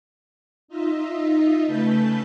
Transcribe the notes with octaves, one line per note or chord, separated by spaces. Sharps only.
D#4 F4 D#5 E5
C#3 A3 B4 A5 G6 B6